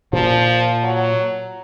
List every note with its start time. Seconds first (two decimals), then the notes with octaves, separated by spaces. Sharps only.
0.13 A#2 F3
0.84 F#3